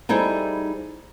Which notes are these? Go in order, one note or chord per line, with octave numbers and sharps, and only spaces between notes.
G3 D#4 E4 G#4 A4 C5